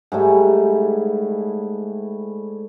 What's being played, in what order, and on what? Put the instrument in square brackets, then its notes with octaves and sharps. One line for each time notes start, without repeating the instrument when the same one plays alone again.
[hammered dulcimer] G#2 G3 A3 E4